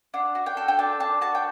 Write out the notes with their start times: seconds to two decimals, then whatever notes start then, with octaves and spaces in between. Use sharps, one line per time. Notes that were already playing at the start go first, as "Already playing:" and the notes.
0.14 D4 F#5
0.35 F#4
0.46 G5
0.57 A4
0.68 G5
0.79 D4 A5
1.00 D4 A5
1.21 F#4 A5
1.35 G5